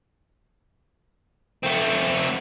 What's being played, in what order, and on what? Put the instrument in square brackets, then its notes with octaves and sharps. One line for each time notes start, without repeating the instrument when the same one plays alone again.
[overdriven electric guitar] A3 C4